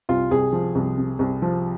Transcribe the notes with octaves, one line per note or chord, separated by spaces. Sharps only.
C2 F4
C2 G#4
F3
C2
C3
C2
F3